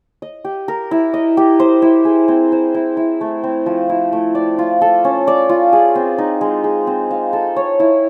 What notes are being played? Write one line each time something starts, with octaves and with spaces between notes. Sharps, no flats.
D#5
G4
A#4
E4
D#5
G4
C5
E4
G#4
C4
C5
E4
E4
A3
C4
F3
E4
A3
D5
F4
A4
C#4
D5
F4
G#4
C4
D#4
G#3
G#4
C4
F5
A4
C#5
E4